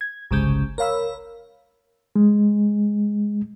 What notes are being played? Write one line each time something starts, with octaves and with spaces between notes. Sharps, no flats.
G#6
G1 C2 C#3 G#3 G6
A#4 C#5 F5 B5 E6
G#3